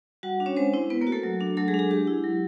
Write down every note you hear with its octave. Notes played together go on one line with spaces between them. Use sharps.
G3 F#4 F#5
D4
C#4 C#5
G#3 C4 C5
C4 E4 C5
B3 B4
A#3 A#4
F#4
A3 A4
F#3
D4
F#3 A3 A4
G#3 G#4
D4
G#3 G#4
G#3 G4
E4
F#3